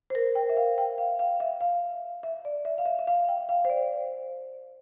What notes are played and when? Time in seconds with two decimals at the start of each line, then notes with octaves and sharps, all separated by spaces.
0.10 C5
0.15 A#4
0.35 G5
0.49 E5
0.57 F5
0.78 G5
0.98 F5
1.19 F5
1.40 E5
1.61 F5
2.23 E5
2.45 D5
2.65 E5
2.78 F5
2.86 E5
2.99 E5
3.07 F5
3.28 G5
3.49 F5
3.65 C5
3.70 D5